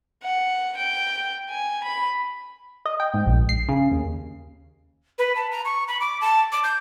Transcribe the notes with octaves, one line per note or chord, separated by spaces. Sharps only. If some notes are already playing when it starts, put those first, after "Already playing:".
F#5
G5
G#5
B5
D#5
G5
G#2
A#1
C7
C#3
D#2
B4
A5
A#5
C#6
B5
D6
A5
D6
G6